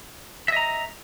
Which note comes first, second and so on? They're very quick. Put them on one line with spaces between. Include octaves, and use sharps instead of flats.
E5 D#5 A#5